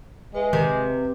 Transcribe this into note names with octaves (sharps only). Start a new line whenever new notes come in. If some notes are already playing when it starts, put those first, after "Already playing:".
G#3 B4 E5
C3 D#3